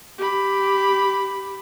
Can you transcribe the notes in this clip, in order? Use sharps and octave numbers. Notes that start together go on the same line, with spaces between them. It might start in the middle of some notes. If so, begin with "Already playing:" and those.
G4 B5